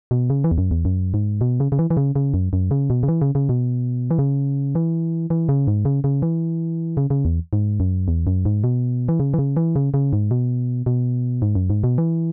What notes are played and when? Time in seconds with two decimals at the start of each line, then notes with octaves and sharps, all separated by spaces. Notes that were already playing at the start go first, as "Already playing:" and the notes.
0.11 B2
0.30 C#3
0.44 E3
0.51 E2
0.58 F#2
0.71 E2
0.85 F#2
1.14 G#2
1.41 B2
1.60 C#3
1.72 C#3
1.79 E3
1.90 E3
1.97 C#3
2.16 C#3
2.34 F#2
2.53 F#2
2.71 C#3
2.90 B2
3.03 C#3
3.08 E3
3.22 C#3
3.35 C#3
3.49 B2
4.11 E3
4.19 C#3
4.75 E3
5.30 E3
5.49 C#3
5.67 G#2
5.85 C#3
6.04 C#3
6.22 E3
6.97 C#3
7.10 C#3
7.25 E2
7.53 G#2
7.80 F#2
8.08 E2
8.27 F#2
8.45 G#2
8.64 B2
9.09 E3
9.20 C#3
9.34 E3
9.39 C#3
9.57 E3
9.76 C#3
9.94 C#3
10.13 G#2
10.31 B2
10.86 B2
11.42 G#2
11.55 F#2
11.70 G#2
11.84 B2
11.98 E3